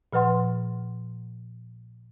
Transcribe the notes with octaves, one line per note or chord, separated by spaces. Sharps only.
A#2 F3 B4 F#5 C6